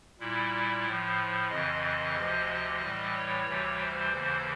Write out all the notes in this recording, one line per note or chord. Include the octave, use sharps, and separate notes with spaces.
A#2 G3 E4
A2 F3
F2 C#3 E3 D#5
D#5
D2 C3 F3
A2 E3 G3
C#5
D2 C3 E3 G3
C5
D#2 C#3 E3